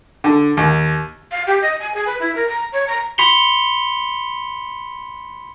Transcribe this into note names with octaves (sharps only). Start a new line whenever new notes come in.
D3
D#2
F5
G4
D#5
G#5
G#4
B4
E4
A#4
A#5
C#5
A#5
B5 C6 B6 C#7 F7 G7